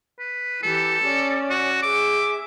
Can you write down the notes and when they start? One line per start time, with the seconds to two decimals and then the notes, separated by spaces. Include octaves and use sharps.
0.19 B4
0.63 E3 G4 A4
1.04 C#4 D5
1.50 F#4
1.83 G#4 E5 D6